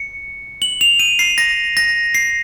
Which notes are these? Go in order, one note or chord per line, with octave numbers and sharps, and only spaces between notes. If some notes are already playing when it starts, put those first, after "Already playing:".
Already playing: C#7
F#7
F7
D#7
C7
A#6
A#6
C7